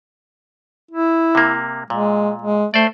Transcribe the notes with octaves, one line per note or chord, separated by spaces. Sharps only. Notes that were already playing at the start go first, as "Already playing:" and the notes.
E4
C3 A#3
A#2 G#3
G#3
A3 C5 D5